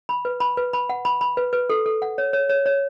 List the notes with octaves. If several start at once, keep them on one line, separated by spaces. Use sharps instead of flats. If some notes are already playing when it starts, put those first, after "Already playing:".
B5
B4
B5
B4
B5
F#5
B5
B5
B4
B4
A4
A4
F#5
C#5
C#5
C#5
C#5